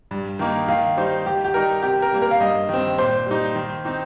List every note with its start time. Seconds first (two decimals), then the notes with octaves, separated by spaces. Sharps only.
0.11 G2
0.39 D#3 A#3 D#4
0.68 D#3 F5
0.97 G3 D#4 C5
1.26 D#3 G4
1.45 G4
1.54 G3 D#4 A#4
1.83 C3 G4
2.02 A#4
2.12 G3 A#3
2.22 A#4
2.31 F5
2.41 G2 D#5
2.69 D#3 C4
2.98 A#2 C5
3.26 G3 D#4
3.55 D#3
3.85 C4 D#4